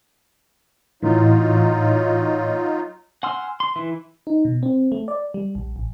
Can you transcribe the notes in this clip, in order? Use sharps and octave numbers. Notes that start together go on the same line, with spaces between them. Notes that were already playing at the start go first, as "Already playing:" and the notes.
A2 E3 F#3 D#4 F4
F#5 G#5 C6 E6 F6
C6
E3 E4
D#4
B2
C4
A3
D5
G3
A#1
A1